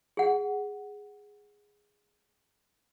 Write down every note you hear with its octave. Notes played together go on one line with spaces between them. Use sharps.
G#4 F#5